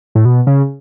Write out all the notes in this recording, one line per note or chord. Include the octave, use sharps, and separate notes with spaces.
A2
B2
C#3